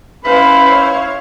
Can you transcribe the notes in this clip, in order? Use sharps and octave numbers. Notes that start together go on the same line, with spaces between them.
C#4 E4 B4 C5 F5 B5
C#5